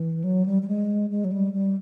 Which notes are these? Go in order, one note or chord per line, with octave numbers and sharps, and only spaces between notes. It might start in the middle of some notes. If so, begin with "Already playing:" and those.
Already playing: E3
F#3
G3
G3
G#3
G#3
F#3
G3
G3